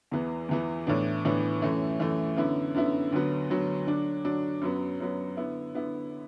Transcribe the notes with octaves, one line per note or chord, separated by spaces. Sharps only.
E2 E3 B3
E2 E3 B3
A2 E3 B3 D4
A2 E3 B3 D4
F#2 E3 A3
F#2 E3 A3
F#2 D3 B3 E4
F#2 D3 B3 E4
D2 D3 F#3 B3
D2 D3 F#3 B3
D3 F#3 D4
D3 F#3 D4
F#2 F#3 B3
F#2 F#3 B3
D3 B3 E4
D3 B3 E4